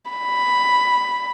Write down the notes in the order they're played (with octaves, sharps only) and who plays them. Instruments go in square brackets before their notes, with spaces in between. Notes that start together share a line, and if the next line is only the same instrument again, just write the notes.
[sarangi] B5